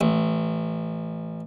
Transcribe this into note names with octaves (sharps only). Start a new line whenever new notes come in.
A1